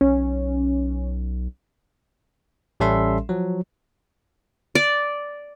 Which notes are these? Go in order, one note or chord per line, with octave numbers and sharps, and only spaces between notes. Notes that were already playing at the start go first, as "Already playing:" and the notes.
B1 C#4
A1 G3 C#4 A4 E5 C6
F3 F#3
D5